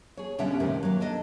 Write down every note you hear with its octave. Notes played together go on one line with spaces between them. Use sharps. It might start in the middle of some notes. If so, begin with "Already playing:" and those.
G#4 C#5
B2 D3 G3 C#4 E5 F#5
D#2 A2 C3 D#3
F#3 A#3
D4 A4 D#5